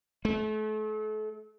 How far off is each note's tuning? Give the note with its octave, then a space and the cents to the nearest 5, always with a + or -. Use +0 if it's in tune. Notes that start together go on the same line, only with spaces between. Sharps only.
A3 -35